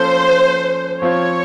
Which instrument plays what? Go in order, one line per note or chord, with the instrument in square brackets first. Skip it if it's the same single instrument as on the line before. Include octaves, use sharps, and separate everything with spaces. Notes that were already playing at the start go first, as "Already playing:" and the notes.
Already playing: [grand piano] F3 A#3 C#4 A4 [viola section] C5
[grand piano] F3 C4 F4 C5 [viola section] C#5